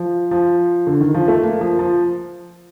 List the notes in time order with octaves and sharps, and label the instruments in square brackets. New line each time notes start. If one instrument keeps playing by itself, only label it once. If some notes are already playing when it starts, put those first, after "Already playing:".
Already playing: [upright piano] F3
F3
D3
D#3
F3
A3
A#3
F3
F3